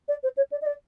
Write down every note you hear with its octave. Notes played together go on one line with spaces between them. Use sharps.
D5
C5
C#5
D5
D#5
D5